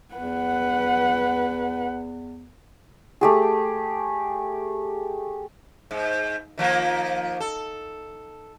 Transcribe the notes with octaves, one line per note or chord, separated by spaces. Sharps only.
E2 B4 F#5
A3 G4 G#4
G#2
D#3 F3 A#3
A4